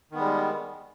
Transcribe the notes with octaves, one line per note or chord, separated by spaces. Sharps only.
D#3 G3 G#3 B3